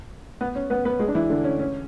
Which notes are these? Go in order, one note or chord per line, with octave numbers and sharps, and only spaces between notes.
B3
C#4
B3 B4
B3 B4
G#3 G#4
D4
E3 E4
D3 D4
C#4
C#4